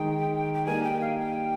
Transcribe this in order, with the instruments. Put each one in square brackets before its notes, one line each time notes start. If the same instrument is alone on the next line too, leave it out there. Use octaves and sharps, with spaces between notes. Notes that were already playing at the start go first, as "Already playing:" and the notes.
Already playing: [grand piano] D#3 G#3 D#4 G#4 [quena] G5
[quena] G5
[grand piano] G3 A#3 D#4 A#4 [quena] G#5
[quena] G5
F5
G5